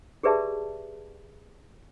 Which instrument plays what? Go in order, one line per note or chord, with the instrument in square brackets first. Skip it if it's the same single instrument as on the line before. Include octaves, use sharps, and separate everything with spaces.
[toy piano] G4 G#4 B4 D5 E5 A5